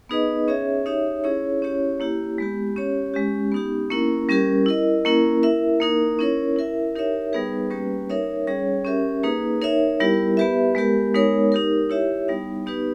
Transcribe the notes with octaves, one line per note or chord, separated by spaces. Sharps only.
B3 D#4 G#4 B4 D#5
C#4 G#4 C#5 E5
D#4 G4 C#5 E5
C#4 E4 G#4 C#5
C#4 E4 G4 C#5
A#3 E4 G4
G#3 B3 G4
C#4 G4 C#5
G#3 C#4 G4
B3 D#4 G4
A#3 C#4 E4 A#4
G3 C#4 G4 A#4
E4 A#4 D#5
A#3 C#4 E4 A#4
E4 A#4 E5
A#3 D#4 A#4
C#4 E4 A#4 C#5
E4 A#4 E5
D#4 G4 A#4 C#5 E5
G3 B3 D#4 G#4 B4
G3 A#3 C#4 G4 B4
D#4 A#4 C#5 E5
G3 C#4 G#4 C#5
C#4 G4 A#4 E5
A#3 D#4 G#4 B4
D#4 A#4 C#5 E5
G3 B3 E4 G4 A#4
B3 G4 B4 E5
G#3 B3 G4 A#4
G#3 B3 D#4 A#4 C#5
D#4 G4 A#4
E4 G4 C#5 E5
G3 B3 D#4
B3 D#4 G4 B4